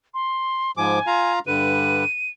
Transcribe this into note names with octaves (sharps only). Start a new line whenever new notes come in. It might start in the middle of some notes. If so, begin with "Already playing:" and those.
C6
G#2 F3 G#5 D6
F4 F5 A#5
G2 D3 B4 D#7